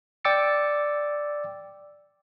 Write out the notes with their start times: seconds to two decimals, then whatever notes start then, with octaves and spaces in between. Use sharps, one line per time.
0.25 D5 G5 D6 E6 A6 C#7